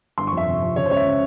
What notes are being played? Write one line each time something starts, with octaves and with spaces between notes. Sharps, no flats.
G1 C6
F2 C#6
E5
C3
F2
C#3 C#5
C5
C#2 C#5
E5
C#3